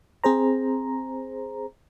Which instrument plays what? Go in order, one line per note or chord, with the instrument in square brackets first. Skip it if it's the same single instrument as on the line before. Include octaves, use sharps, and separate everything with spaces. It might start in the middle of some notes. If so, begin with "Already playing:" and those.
[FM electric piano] C4 G#4 C5 A#5